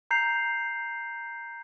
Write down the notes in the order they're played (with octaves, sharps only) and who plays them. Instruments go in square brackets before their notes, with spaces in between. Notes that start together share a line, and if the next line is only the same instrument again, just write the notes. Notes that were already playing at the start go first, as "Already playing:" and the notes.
[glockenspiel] A#5 G6 C7 F7